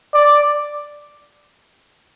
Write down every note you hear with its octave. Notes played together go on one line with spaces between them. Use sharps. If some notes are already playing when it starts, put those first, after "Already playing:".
D5